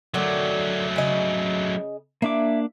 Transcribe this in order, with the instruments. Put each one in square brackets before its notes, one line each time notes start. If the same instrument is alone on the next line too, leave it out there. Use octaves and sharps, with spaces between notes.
[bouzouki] D3 D#3 F#4 [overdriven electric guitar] F#3 A3
[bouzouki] C#3 D#5
[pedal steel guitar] A#3 D4 D6 [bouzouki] E4